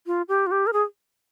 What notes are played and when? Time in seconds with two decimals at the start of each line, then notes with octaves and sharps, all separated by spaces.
0.07 F4
0.28 G4
0.47 F4
0.51 G4
0.67 A#4
0.73 G#4